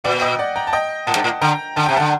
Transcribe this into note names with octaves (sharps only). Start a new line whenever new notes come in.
A#2 D5 F#5
D#5 G5
D5 F#5
G5 A#5
A5
D#5 G5
A2 F#5 A5
G2
A2
D3 G5 A#5
D3 A5
C3 G5
F#5 A5
D3